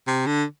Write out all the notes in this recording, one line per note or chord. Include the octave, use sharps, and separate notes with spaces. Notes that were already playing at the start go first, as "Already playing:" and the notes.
C3
D3